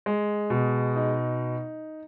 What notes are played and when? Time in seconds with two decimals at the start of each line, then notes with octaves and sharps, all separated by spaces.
0.06 G#3
0.50 B2
0.96 D#4